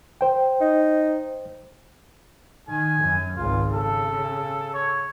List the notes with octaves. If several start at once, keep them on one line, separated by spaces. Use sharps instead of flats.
C5 G5
D#4
D#3 G#5
F#2
G#1 C#2 F4
C#3 A4
C#5